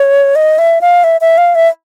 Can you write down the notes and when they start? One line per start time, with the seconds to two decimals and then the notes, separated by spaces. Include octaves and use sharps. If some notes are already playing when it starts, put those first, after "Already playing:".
Already playing: C#5
0.35 D#5
0.58 E5
0.81 F5
1.04 E5
1.21 E5
1.38 F5
1.55 E5